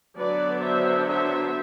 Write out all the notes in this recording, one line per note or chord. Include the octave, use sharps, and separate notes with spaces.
D3 F#3 B3 D4 B4 D5
C5 E5
C5 E5